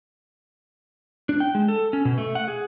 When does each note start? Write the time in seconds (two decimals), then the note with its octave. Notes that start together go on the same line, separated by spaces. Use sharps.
1.29 D4
1.40 G5
1.55 G#3
1.68 A4
1.93 C#4
2.05 B2
2.18 A3
2.35 F#5
2.48 G#4